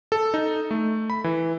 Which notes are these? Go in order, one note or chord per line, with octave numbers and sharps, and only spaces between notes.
A4
D#4
A3
B5
E3